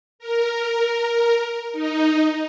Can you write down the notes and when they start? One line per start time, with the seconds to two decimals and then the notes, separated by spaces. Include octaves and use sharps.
0.19 A#4
1.72 D#4